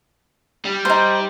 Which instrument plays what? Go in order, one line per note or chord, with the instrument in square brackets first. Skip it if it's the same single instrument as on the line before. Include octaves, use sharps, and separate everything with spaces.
[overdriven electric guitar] G3
[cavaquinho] D#4 C5